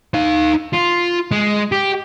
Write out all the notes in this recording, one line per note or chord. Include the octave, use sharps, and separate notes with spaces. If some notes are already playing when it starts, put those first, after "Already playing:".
D#4 F5
F4
G#3
G4